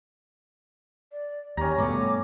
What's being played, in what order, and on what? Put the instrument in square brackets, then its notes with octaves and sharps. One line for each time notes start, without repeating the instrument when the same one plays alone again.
[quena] D5
[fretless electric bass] D#2 [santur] C#4 A#5 [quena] G4
[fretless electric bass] G2 B2 A3 [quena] D6